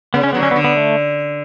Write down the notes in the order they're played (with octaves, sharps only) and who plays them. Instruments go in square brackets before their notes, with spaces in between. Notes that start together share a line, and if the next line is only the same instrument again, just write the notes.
[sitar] C#3 [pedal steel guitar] B3
[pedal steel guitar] C#4
[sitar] D3 F#3 [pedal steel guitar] B3
[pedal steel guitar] C#4
B3
[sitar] D3
[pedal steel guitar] B3
A3